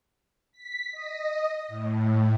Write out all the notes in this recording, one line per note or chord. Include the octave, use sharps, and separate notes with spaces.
B6
D#5
A2